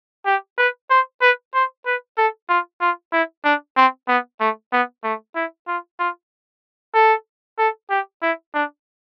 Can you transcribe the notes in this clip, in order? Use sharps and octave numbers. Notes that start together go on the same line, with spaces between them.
G4
B4
C5
B4
C5
B4
A4
F4
F4
E4
D4
C4
B3
A3
B3
A3
E4
F4
F4
A4
A4
G4
E4
D4